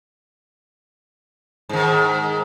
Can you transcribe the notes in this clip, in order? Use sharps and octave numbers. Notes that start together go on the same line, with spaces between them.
G#2 D#3